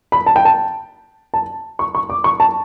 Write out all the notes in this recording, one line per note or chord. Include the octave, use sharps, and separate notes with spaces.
B5
A5
G5
A5
A5
C#6
C#6
D6
C#6
A5